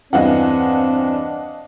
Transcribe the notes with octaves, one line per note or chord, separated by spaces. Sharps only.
E2 G2 E3 C4 D4 D#5 F5 F#5